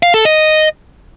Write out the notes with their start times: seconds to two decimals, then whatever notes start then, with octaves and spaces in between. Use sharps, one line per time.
0.03 F5
0.14 A4
0.25 D#5